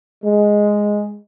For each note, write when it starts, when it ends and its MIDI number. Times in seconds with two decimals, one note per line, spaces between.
0.25 1.17 56